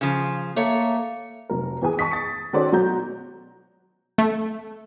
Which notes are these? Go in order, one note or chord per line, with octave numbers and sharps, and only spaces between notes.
C#3 F3
A3 A#3 C#5
F1 F#3 A#4
E2 E3 G#4 G#5 D#6
A5 C#6 D#6 B6
A6 C#7
D#3 C#4 F#4 A4 C5 D5
B2 F#3 F#4 A#5 G6
A3